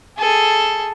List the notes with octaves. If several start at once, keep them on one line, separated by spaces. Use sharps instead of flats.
G#4 A4